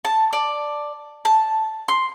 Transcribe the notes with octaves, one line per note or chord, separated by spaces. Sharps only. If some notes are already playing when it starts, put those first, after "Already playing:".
A5
D5
A5
C6